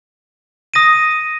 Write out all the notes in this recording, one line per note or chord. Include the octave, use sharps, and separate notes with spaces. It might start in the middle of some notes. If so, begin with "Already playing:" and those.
D#6 A#6 D#7